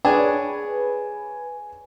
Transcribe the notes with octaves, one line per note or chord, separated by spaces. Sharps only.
D4 G#4 B4 C#5 G#5